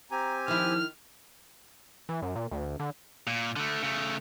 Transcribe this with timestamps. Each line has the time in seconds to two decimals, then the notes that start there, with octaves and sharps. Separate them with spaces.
0.11 C4 G4 G#5 A#5
0.48 D#3 F3 E4 F6
2.09 E3
2.22 F#2
2.35 A#2
2.51 D2
2.80 D3
3.27 A#2
3.56 D3 A3
3.83 C#3 A3